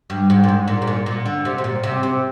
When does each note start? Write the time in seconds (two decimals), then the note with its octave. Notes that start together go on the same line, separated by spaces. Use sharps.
0.10 G2
0.30 G#2
0.44 A#2
0.48 G#2
0.68 A#2
0.82 G#2
0.87 A#2
1.06 A#2
1.26 D3
1.45 C3
1.58 C3
1.64 A#2
1.83 C3
2.03 C3